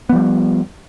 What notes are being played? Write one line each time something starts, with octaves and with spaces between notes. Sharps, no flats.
F3 G3 B3